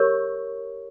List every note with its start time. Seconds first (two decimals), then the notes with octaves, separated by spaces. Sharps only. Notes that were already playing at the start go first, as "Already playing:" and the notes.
Already playing: G4 A#4 C#5 C#6